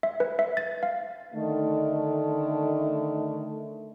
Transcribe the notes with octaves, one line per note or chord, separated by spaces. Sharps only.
E5
B4
E5
A6
F5
D3 D#3 A3